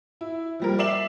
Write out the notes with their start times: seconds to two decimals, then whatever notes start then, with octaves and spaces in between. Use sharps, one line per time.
0.21 E4
0.60 F3 G3 A#4
0.79 D5 E5 C7 E7 F#7